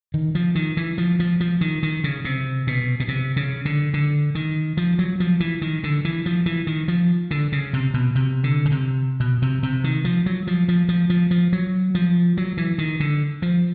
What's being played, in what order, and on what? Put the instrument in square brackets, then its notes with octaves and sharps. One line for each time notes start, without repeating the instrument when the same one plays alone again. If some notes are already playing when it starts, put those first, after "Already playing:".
[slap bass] D#3
F3
D#3
E3
F3
F3
F3
D#3
D#3
C#3
C3
B2
B2
C3
C#3
D3
D3
D#3
F3
F#3
F3
E3
D#3
D3
E3
F3
E3
D#3
F3
D3
C#3
C3
B2
C3
D3
C#3
C3
B2
C3
C3
D#3
F3
F#3
F3
F3
F3
F3
F3
F#3
F3
F#3
E3
D#3
D3
F3